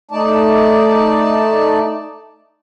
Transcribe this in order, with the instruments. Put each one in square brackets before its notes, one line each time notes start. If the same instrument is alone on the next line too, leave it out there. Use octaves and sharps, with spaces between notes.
[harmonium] A3 D#4 D5 A5